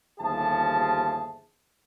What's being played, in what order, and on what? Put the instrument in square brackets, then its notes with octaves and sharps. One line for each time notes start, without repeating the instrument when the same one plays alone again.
[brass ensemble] G1 D#2 F3 G#4 E5 A5